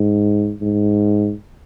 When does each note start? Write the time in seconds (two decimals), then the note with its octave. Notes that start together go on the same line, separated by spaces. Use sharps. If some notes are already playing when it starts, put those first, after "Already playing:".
Already playing: G#2
0.61 G#2